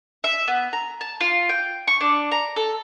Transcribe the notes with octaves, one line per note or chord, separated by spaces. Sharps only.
E5
B3
A#5
A5
F4
G5
C#6
D4
A#5
A4